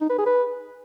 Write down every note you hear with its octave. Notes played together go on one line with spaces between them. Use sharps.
D#4
B4
G#4
B4